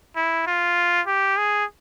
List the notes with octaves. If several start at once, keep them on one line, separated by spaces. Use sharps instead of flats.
E4
F4
G4
G#4